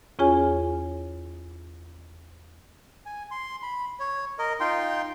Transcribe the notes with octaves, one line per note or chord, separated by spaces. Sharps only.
E2 C#4 F4 G#4 C#5 G#5
G#5
C6
B5
C#5
A#4 D#5
D#4 F4 G5 C6